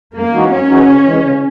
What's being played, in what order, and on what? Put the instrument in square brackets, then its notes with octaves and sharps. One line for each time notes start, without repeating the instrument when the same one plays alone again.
[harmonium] F#2 [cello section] A#3
[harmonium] E3 G#3 D#4 F#4
[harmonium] F#2 [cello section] C#4
[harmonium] E3 G#3 D#4 F#4
C#3
E3 G#3
C#3